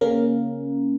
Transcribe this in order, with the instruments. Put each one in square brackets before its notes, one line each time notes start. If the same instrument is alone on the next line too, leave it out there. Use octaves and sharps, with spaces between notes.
[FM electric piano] C#3 A#3 C#4 A#4